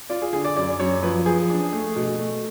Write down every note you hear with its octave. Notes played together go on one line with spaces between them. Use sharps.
F4 D5
G#4
D3 G#4
D5
F#2 D5
F#2 C#5
F3 B4
F3 G#4
D4
A3
B2
A3